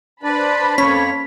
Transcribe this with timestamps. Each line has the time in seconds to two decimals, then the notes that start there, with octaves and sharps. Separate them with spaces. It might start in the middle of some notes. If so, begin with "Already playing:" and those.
0.23 D4 B4 C5 D5 A5 B5
0.78 F2 A#3 C#4 C#5 B6